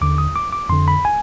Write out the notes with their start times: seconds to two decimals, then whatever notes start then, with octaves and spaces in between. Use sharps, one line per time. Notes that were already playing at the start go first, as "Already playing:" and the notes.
0.01 D#2 D3 D6
0.18 D#6
0.36 D6
0.53 D6
0.69 F2 D3 C6
0.88 B5
1.05 G#5